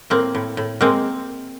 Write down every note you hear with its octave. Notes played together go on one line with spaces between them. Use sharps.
A2 A#3 C4
A2
A2
G#3 A#3 C4